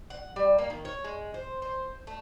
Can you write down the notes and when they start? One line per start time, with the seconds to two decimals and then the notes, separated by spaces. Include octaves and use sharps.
0.10 F#5
0.36 G3
0.58 A#3
0.70 D#3
0.85 C#5
1.04 G#3
1.34 C5
1.62 C5
2.07 A3